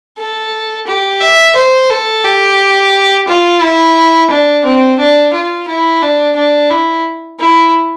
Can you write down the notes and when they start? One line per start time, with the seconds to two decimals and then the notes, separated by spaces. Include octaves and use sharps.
0.18 A4
0.87 G4
1.21 E5
1.55 C5
1.90 A4
2.24 G4
3.28 F4
3.61 E4
4.31 D4
4.65 C4
4.99 D4
5.33 F4
5.68 E4
6.02 D4
6.36 D4
6.70 E4
7.40 E4